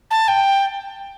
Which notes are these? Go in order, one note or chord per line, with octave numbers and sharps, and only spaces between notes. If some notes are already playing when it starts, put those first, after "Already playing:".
A5
G5